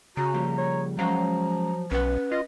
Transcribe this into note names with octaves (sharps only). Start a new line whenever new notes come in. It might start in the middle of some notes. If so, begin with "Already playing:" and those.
C#3 F#4 A#5
F3 G3 A#3
C#5
F3 F#3 G#3 C#4 F5 A#5
B1 C#4 B4 F#5
F4 D#5